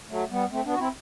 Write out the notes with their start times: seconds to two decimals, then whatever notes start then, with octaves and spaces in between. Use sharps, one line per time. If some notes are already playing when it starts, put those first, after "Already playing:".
0.10 F#3 A3
0.30 G3 B3
0.51 A3 C4
0.65 B3 D4
0.73 F#4
0.79 C4 E4